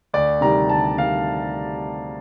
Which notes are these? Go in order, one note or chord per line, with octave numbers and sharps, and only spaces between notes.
D2 D5
C3 D#3 G3 A#5
D2 A5
C3 D#3 G3 F5